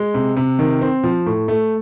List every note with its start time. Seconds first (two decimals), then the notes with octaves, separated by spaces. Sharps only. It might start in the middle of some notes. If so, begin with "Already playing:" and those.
Already playing: G#3
0.14 C3
0.37 C3
0.59 D#3
0.81 C4
1.03 F3
1.26 A2
1.48 A3